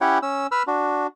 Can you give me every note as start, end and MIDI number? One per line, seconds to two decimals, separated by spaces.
0.01 0.19 61
0.01 0.19 64
0.01 0.19 67
0.01 0.19 73
0.01 0.19 78
0.01 0.19 79
0.22 0.47 61
0.22 0.47 88
0.52 0.63 71
0.52 0.63 83
0.52 0.63 88
0.52 0.63 89
0.67 1.07 62
0.67 1.07 66